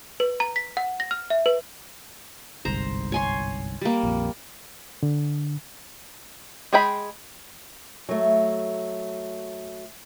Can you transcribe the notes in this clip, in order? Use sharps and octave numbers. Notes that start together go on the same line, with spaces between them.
B4
A#5
B6
F#5
A#6
F6
E5
B4
G1 C2 G#2 C5 A#5
C#5 G#5 C6
G3 A#3
A#1 F2
D3
G#3 G#4 G5 B5
F#3 A3